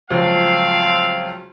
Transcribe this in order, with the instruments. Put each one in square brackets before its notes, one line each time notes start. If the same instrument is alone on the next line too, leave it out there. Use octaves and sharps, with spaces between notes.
[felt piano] C#2 F3 F#3 [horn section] A3 C4 F5